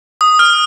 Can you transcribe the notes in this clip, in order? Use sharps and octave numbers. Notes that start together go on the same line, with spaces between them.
D#6
F6